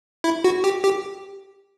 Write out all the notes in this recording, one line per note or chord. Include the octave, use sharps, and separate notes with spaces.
E4
F#4
G4
G4